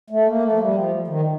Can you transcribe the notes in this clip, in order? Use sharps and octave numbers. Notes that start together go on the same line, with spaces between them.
A3
A#3
A3
F3
G3
F3
D#3